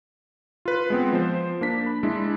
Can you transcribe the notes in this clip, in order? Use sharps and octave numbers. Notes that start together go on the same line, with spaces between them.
F4 B4
G#3 B3 C4
F3 C5
A#3 D4 B6
B5
G#3 D4 E4